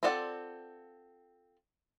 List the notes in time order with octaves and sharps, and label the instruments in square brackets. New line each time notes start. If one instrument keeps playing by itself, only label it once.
[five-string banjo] C4 F4 A4 D5 F#5